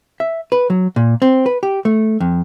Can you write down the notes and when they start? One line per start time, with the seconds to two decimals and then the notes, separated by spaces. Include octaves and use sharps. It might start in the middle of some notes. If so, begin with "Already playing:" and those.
0.20 E5
0.52 B4
0.70 F#3
0.96 A#2
1.22 C4
1.46 B4
1.63 G4
1.85 A3
2.20 F2